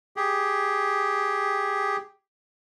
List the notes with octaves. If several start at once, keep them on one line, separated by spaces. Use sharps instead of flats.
G4 G#4